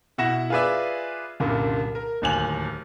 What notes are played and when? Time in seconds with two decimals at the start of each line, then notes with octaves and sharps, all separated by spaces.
0.18 B2 E4 F#5 A#6 E7
0.50 F4 G#4 B4 D5 E5
1.40 C2 F#2 A#2 D3 A#3
1.95 A#4
2.22 D1 D#2 G#5 F#7